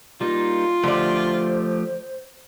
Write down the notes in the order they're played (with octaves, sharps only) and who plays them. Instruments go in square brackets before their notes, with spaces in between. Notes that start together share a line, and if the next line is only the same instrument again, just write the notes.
[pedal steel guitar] G3 A#3 D#4 [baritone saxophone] F4
[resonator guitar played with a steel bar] D3 D5 [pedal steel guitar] F3 A3 G4 [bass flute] C5